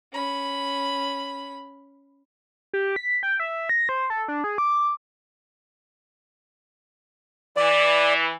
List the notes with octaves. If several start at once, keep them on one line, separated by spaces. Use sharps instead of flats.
C#4 B5
G4
B6
G5
E5
A#6
C5
A4
D4
G#4
D6
E3 D5